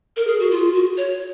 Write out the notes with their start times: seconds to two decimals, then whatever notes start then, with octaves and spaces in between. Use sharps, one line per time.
0.16 A#4
0.27 G#4
0.39 F#4
0.51 F4
0.73 F#4
0.97 C#5